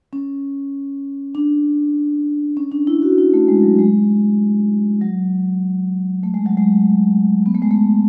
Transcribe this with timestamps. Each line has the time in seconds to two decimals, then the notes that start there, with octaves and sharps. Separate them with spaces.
0.13 C#4
1.35 D4
2.57 C#4
2.72 D4
2.87 E4
3.02 F#4
3.18 E4
3.34 A3
3.48 G#3
3.63 F#3
3.79 G#3
5.01 F#3
6.23 A3
6.34 G#3
6.46 F#3
6.57 G#3
7.46 B3
7.55 A3
7.62 G#3
7.71 A3